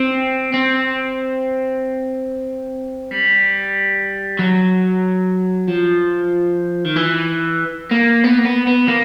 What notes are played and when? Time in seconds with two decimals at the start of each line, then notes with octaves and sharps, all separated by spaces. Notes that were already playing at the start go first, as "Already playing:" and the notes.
Already playing: C4
0.54 C4
3.11 G3
4.39 F#3
5.68 F3
6.85 D#3
6.96 E3
7.91 A#3
8.24 B3
8.39 A#3
8.45 B3
8.67 B3
8.88 A#3